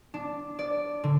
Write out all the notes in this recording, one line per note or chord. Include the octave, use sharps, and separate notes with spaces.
D4
D5
D3